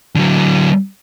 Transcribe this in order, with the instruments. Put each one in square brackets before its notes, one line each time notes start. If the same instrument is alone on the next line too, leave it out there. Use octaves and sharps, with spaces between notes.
[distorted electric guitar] D3 F#3